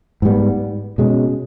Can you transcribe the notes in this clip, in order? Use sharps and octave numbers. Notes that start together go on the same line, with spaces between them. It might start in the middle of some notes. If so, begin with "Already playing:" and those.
G#2 G3 B3
B2 G#3 C#4